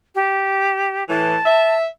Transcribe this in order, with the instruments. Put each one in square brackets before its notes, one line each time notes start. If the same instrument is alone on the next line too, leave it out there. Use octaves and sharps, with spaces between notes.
[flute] G4
[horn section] A2 E3 [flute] A5
[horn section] E5